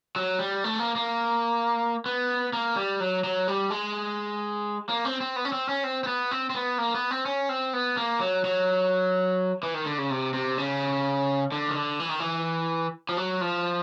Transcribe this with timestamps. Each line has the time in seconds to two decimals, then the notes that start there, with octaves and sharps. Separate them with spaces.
0.16 F#3
0.39 G3
0.64 A3
0.79 A#3
0.96 A#3
2.06 B3
2.53 A#3
2.76 G3
3.00 F#3
3.24 F#3
3.48 G3
3.70 G#3
4.89 A#3
5.05 C4
5.21 C4
5.36 B3
5.45 C#4
5.52 C4
5.69 C#4
5.84 C4
6.04 C4
6.07 B3
6.31 C4
6.50 C4
6.54 B3
6.78 A#3
6.94 B3
7.11 C4
7.26 C#4
7.49 C4
7.73 B3
7.97 A#3
8.20 F#3
8.45 F#3
9.63 E3
9.74 D#3
9.86 D3
9.98 C#3
10.10 C3
10.34 C3
10.58 C#3
11.52 D3
11.68 D#3
11.75 D3
12.00 E3
12.09 D#3
12.20 E3
13.09 F3
13.17 F#3
13.41 F3